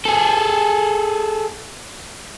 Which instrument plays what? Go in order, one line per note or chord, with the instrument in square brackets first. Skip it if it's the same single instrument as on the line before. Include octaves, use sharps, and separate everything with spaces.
[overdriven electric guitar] G#4 A4